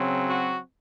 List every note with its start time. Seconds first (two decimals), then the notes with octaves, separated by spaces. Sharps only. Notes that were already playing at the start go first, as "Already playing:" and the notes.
Already playing: C#3 F#3 C4
0.27 F#4